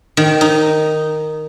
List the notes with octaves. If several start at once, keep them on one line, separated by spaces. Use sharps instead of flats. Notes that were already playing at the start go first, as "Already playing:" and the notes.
D#3
D#4